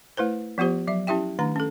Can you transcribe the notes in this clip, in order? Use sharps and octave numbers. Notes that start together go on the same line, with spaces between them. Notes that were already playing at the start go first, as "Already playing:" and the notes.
A3 E4 B4 C5
F3 B3 F4 G4 C5
F#3 E5
C#4 E4 G4 E5 G5
D#3 A3 D4 A#5
C#4 A4